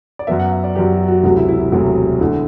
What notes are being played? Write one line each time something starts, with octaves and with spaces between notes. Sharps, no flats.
D5
F#2 F#3 B3 E5
F#5
E5
D5
F#2 F#3 B3 G4
F#4
F#4
E1 D2 C3 F#3 A3 F#4
E4
E4
E4
E1 D2 C3 F#3 A3 F#4
E2 D3 A3 E4